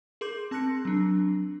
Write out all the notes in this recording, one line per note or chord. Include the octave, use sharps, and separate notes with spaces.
G#4 A#4 C6 D6 G6
C4 A5 C6 F#6 A#6 C#7
F#3 D4